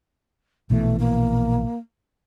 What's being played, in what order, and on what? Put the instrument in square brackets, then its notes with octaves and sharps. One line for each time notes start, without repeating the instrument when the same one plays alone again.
[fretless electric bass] A#1 B2 E3 [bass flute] A3
[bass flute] A#3